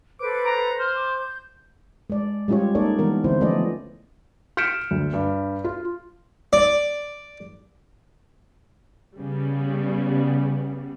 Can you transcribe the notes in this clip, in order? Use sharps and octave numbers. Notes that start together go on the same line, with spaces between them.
A4 B4 C5 D6
A#5
C5 F6
D6
G6
G#3 D5
G3 G#3 C#4 F4 G4 C#5
A#3 D#4 A4 C#5 D5
E3 G#3 B3 A#4
D3 E3 C4 E4 C5
F3 A3 B3 C#4 D5 D#5
F6 G6 B6 C#7 D7 E7
D2
G2
F4
D5
C#3 G3 B3